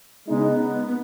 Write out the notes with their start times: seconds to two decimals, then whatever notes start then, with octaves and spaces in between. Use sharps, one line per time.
0.29 C#3 G#3 B3 D#4
0.87 B3